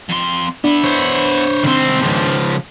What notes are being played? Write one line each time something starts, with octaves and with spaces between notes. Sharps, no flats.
F2 C6
B3 D4 E4
C5 C#5
C2 D#3 C4 C5
C#2 F3